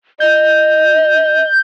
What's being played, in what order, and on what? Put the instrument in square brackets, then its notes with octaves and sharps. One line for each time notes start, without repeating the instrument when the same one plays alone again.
[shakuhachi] D#5 [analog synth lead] G6